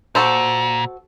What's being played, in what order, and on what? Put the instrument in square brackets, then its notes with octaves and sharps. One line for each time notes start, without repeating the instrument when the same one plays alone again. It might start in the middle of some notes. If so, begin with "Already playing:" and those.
[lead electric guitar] A#2 [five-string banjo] F#4 A4 C5